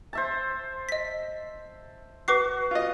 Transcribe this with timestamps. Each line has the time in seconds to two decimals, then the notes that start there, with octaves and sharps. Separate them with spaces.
0.13 C5 E5 A5
0.89 D#5 B6
2.28 F#4 B4 D6 C7
2.71 F4 D#5